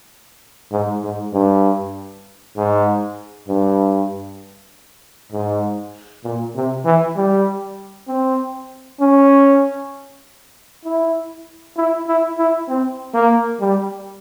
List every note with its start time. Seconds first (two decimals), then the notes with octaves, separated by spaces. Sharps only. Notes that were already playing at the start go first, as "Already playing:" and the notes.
0.72 G#2
1.02 G#2
1.33 G2
2.56 G#2
3.48 G2
5.32 G#2
6.24 A#2
6.55 C3
6.85 E3
7.16 G3
8.08 C4
9.00 C#4
10.85 E4
11.77 E4
12.07 E4
12.38 E4
12.68 C4
13.14 A#3
13.60 G3